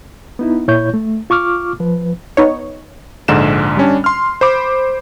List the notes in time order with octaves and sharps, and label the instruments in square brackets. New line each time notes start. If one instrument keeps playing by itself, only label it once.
[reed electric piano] B3 D#4 E4
A#2 E4 C#5 C#6 G6
A3
F4 C#6 D6 F6
F3 B4
[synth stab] B3 D#4 C#5
[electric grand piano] A#1 G#2 D3 E7
G3 C#4 D4
C6 F6
C5 B5 D6